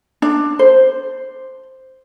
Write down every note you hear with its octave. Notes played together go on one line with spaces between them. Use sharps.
D4
C5